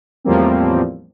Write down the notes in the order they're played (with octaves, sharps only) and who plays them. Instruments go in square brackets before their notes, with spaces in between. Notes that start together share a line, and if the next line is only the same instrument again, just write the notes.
[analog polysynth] E2 A2 F3 G3 A#3 C4